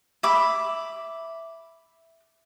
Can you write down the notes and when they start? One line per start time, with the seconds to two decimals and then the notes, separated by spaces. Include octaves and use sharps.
0.23 E5 B5 D6